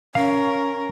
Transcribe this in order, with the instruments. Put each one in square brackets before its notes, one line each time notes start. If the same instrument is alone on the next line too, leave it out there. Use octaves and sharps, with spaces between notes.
[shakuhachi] C#4 [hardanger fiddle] A#4 [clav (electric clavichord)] F5